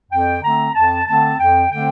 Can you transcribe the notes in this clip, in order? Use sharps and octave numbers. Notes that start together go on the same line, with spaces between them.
F2 G5
D3 A3 C4 A#5
F2 A5
D3 A3 C4 A5
F2 G5
D3 A3 C4 G5